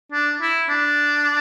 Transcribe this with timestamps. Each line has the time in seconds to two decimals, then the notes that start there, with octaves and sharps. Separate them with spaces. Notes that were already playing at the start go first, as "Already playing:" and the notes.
0.11 D4
0.41 E4
0.69 D4